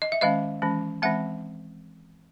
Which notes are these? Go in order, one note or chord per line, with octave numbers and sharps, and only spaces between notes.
D#5
E5
D#3 G#3 C#4 D#5 F5
E3 G#3 C#4
E3 G#3 C4 E5 F#5